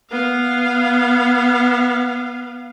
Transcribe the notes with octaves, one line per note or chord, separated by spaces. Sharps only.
B3 F5